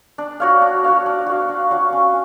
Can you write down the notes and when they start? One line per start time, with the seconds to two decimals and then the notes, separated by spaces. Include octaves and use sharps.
0.18 D4
0.40 F#4 C#5 F5
0.62 D4
0.84 F#4 C#5 F5
1.06 D4
1.26 F#4 C#5 F5
1.49 D4
1.71 F#4 C#5 F5
1.93 C#4